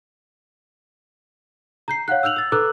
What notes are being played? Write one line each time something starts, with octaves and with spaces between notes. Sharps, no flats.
A#5 G6 C7
C#5 F5 F#5 F#6
E6 F6 G6 F7 F#7
E6 A6
A4 B4 A#5 D6 E6 F#6